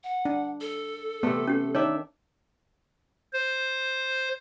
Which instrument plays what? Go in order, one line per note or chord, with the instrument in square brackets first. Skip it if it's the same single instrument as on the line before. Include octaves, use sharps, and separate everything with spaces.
[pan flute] F#5
[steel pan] D4
[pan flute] A4
[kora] C3 A3 [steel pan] B3
[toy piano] C#4 G4
[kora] D#3 D4 E5 [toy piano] C#5
[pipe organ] C5